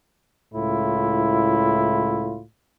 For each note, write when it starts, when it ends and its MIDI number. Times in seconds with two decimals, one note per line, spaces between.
0.53 2.42 37
0.53 2.42 45
0.53 2.42 64
0.53 2.42 65